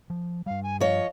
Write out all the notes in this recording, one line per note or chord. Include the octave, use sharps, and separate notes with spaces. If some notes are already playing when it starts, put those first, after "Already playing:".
F3
G2 G3 F5
G#5
F3 C#5 D#5